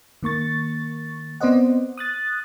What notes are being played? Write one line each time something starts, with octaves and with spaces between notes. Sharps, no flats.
D#3 A#3 C#6 A6
B3 C4 C5 D5 D#5 F#5
D#6 F#6 A6